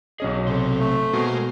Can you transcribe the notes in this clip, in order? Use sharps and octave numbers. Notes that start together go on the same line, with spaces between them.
B1 C#4 F#4 G#4 D#5
C3 A4 C6
A3
B2 G#3 A#3 C5